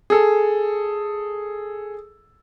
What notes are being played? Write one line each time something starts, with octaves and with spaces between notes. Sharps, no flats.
G#4 A4